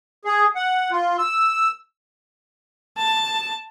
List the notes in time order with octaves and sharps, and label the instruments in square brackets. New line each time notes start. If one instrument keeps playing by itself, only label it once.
[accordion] G#4
F#5
F4
E6
[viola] A5